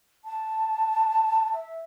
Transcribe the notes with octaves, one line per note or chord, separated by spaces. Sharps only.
A5
E5